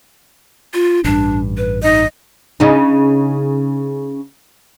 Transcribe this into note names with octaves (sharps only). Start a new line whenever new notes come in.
F4
A1 G2 D4
B4
D#4 D#5
C#3 C#4 D#4